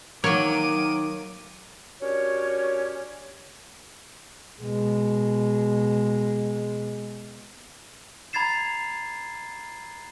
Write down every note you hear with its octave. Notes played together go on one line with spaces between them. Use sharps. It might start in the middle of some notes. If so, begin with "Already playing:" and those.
D#3 F#3 A#3 C#5 D6 D#7
C#4 D4 F#4 G4 A#4 C#5
B2 G#3
A#5 B5 G#6 A6 C7 E7